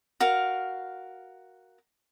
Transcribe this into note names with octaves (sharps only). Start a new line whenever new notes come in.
F#4 A#4 F5